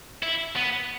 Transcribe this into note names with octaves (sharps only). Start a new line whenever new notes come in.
E4
B3